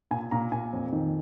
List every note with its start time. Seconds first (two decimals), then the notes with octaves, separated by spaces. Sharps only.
0.11 A#2 G#5
0.31 A#2 A#5
0.52 A#2 G#5
0.73 F2
0.92 D#3